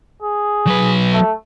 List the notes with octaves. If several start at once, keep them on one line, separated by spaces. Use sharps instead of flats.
G#4
F#3 B4
A3